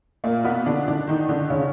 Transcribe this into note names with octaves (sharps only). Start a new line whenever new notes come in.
A#2 A#3
B2 B3
D3 D4
D3 D4
D#3 D#4
D3 D4
C#3 C#4